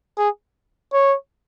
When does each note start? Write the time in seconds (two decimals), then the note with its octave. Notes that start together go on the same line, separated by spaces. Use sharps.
0.18 G#4
0.93 C#5